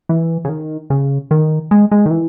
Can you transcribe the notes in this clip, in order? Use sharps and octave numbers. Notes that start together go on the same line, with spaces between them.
E3
C#3
D#3
C#3
D#3
G#3
G#3
D#3
E3